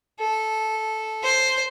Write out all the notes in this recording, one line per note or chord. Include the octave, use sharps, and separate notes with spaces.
A4
C5